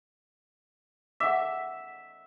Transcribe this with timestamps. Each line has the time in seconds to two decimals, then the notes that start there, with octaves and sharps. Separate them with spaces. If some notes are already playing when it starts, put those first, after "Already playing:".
1.20 E5 F#5 D6